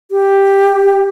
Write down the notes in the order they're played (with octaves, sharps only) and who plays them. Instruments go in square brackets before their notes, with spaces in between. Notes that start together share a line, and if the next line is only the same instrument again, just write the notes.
[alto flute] G4